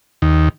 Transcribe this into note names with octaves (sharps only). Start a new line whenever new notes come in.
D#2